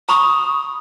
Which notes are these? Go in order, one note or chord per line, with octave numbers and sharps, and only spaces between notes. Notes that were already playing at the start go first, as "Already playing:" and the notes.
A#5 B5 C#6 D#6